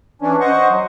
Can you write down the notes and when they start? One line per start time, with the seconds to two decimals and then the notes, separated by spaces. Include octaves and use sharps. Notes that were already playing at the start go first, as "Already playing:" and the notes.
0.22 E3 C#4 D4
0.40 C5 D#5 F#5 C#6
0.70 F#3